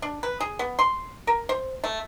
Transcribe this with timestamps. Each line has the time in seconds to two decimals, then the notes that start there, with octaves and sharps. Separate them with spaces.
0.02 D4
0.23 B4
0.40 G#4
0.59 B3
0.79 C6
1.27 A#4
1.49 C5
1.84 A3